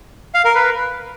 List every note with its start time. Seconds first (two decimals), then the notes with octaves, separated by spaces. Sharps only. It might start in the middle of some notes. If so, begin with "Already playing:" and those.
0.35 F5
0.45 A#4
0.55 B4